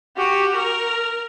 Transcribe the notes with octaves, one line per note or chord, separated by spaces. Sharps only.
F#4 G4
A#4